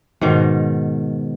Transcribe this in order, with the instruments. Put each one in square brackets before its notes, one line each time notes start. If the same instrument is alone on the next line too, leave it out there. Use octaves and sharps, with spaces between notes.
[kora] G#2 B2 D#3